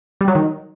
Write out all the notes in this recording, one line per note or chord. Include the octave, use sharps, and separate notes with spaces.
G3
F#3
D#3